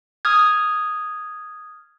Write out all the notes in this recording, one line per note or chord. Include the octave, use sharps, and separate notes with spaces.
D#6 F6 G#6